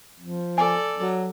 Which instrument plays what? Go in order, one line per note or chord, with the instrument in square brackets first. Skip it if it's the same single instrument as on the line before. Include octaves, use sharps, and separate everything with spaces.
[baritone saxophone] F3
[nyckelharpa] A4 D5 [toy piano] G#5
[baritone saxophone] F#3